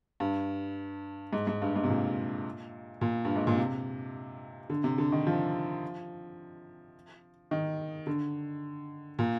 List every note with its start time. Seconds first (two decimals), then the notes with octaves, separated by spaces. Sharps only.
0.20 G2
1.33 G#2
1.47 G#2
1.62 G2
1.76 G#2
1.84 C3
1.89 A#2
3.01 A#2
3.25 G2
3.36 G#2
3.47 A#2
3.58 C3
4.70 D3
4.84 C3
4.98 D3
5.12 D#3
5.27 F3
7.51 D#3
8.07 D3
9.19 A#2